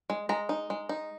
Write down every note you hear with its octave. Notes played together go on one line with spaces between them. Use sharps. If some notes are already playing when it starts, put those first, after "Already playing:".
G#3
G#3 A#5
D#4
G#3
D#4